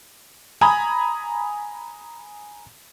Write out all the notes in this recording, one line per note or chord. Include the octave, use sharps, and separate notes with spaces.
G#5 A#5 B5 D#6 G#6